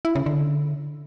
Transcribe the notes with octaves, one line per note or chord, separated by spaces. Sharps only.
E4
C#3
D3